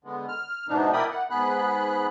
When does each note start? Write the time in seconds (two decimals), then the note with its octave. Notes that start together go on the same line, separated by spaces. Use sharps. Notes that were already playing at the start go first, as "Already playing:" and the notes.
0.05 D3 G#3 B3
0.28 F6
0.68 G#2 B2 E3 B3 D4 D#4
0.93 E4 A#4 D5 G5 B5 D#6
1.11 F#5
1.30 G#2 B3 G#4 B5 F#6